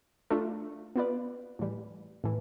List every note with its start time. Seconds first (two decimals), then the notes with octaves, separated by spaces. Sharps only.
0.30 A3 D4 F4
0.96 B3 F4 B4 D5
1.59 A2 E3 G3
2.24 A2 E3